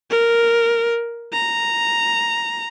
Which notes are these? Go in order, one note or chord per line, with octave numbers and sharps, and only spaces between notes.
A#4
A#5